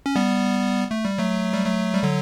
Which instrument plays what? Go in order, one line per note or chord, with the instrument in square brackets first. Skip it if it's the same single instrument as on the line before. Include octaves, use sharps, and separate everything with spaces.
[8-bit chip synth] C#4
G3 B3
A3
G3
F#3 A3
G3
F#3 A3
G3
D3 F#3